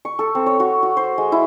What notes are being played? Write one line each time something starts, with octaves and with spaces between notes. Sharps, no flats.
C#6
A4
C4
C#5
F#4
F#4
C5
G#3
E4